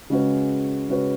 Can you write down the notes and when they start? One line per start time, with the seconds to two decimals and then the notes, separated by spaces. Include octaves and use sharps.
0.10 C#3 G#3 C#4 F#4 B4
0.89 C#3 G#3 C#4 F#4 B4